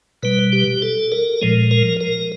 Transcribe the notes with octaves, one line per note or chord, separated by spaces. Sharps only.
B2 G3 B4
G4
A4
A#4
A#2 F3 G#3
A#4
A#4